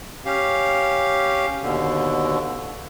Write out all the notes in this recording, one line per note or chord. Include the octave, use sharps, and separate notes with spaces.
C#4 G4 F5
D#2 B2 D3